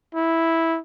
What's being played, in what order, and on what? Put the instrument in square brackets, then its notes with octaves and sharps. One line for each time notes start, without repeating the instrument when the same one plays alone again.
[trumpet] E4